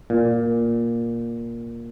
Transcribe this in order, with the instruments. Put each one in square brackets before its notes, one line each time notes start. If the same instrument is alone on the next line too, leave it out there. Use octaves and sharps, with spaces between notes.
[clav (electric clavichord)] A#2